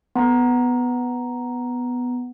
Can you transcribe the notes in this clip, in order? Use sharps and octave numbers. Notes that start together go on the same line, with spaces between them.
B3 A#5